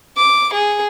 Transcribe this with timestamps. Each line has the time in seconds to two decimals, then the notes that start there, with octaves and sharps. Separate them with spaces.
0.17 D6
0.53 G#4